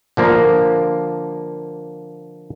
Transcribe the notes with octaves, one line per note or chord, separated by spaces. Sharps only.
D3 F3 A#3